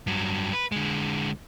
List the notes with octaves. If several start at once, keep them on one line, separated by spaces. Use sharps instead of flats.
G2 F#3
B4
D3 G#3